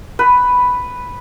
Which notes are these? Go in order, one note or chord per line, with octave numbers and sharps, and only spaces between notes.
B4